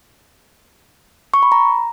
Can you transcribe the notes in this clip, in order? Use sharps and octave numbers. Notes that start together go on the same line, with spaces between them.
C#6
B5
A#5